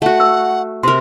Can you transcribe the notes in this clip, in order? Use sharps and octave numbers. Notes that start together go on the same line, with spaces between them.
A3 F#4 F#5
E6
C3 A#4 C6